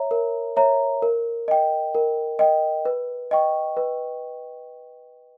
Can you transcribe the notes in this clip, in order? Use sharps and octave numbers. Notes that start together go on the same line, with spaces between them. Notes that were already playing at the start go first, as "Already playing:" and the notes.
Already playing: C#5 E5 A#5
A#4
C#5 E5 A#5
A#4
D#5 G5
A#4
D#5 G5
B4
D#5 G5 C#6
B4